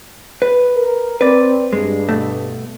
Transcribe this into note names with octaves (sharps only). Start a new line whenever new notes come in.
B4
A#4
C4 B4 D5
G2 G#3
B2 A3